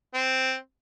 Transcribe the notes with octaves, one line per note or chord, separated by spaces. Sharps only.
C4